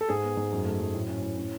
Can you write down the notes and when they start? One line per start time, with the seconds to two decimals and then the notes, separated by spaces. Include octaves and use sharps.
0.01 A4
0.09 G#2 G#4
0.24 B3
0.37 G#2
0.52 F#2
0.65 A3
0.80 F#2
0.94 A2
1.08 C#4
1.22 A2
1.37 C#4